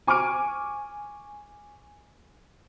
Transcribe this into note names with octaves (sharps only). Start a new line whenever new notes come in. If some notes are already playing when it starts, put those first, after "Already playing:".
G#5 C#6 D6 F6 D7